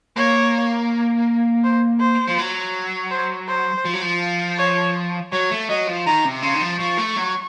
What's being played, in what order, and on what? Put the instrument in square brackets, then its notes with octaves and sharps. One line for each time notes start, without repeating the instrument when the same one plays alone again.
[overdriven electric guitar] A#3 [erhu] C#5
[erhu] C5
C5
[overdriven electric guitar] F3
F#3
[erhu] C5
C5
[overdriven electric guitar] F3
F#3
F3
[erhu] C#5
[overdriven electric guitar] F#3 [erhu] C#5
[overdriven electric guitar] A3
[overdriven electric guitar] F#3 [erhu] D#5
[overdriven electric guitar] F3
[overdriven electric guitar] D#3 [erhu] A#5
[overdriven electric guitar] C3
[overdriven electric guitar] C#3 [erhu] C6
[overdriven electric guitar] D#3
F3
[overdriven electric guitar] F3 [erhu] C#6
[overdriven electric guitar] A3
F#3